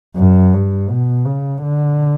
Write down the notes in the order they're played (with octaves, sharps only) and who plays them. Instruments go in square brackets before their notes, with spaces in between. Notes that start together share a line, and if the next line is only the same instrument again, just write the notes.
[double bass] F#2
G2
B2
C#3
D3